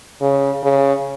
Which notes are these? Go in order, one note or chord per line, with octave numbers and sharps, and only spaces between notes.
C#3
C#3